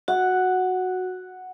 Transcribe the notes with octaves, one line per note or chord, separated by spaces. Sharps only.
F#4 F#5